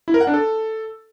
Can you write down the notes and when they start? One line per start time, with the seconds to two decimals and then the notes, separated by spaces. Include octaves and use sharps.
0.08 E4
0.14 A#4
0.21 F#5
0.27 D4
0.34 A4